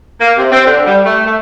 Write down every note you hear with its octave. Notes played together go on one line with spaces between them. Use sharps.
A#3
C3
C4
D3
G3
A3
A3